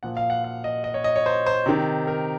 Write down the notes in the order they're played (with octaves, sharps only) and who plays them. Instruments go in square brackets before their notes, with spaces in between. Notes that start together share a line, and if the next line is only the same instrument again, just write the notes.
[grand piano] A#2 F3 F#5
F5
F#5
F5
D#5
D#5
C#5
D#5
C#5
C5
C5
C3 D#3
A#4